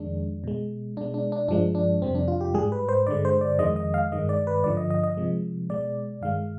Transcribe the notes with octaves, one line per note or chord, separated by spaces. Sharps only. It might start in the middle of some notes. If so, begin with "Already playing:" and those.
Already playing: F2 D#3 G#3 D4
B2 G#3
B2 G#3 D4
D4
D4
G2 F3 G#3 D4
D4
F2 C3 G3 C4
D4
F4
G4
G#2 G3 G#4
B4
C5
G2 D3 G#3 D5
C5
D5
F2 D#3 G#3 D#5
D#5
F5
G2 D#3 G#3 D#5
D5
B4
G2 D3 F3 D5
D#5
D#5
D#5
C3 F3 G#3
B2 G#3 D5
G2 D#3 G#3 F5